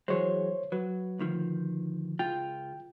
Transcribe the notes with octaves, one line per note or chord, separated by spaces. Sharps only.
E3 F#3 G#3 C5 C#5
F#3 B4
D2 D#3 F3
C#2 F4 G5